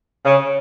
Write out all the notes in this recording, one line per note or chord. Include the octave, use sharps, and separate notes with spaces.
C#3